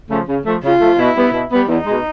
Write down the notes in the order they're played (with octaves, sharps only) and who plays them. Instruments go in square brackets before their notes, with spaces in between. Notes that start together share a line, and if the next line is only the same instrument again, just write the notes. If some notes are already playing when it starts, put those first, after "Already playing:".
[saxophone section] C#3 F3 A3
C#3
F3 A3
[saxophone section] C#3 [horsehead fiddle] F4
[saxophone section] F3 A3
[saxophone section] B2 [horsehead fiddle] E4
[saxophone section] G3 B3
B2
G3 B3
[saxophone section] E2 [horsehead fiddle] D#4
[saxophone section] B2 G#3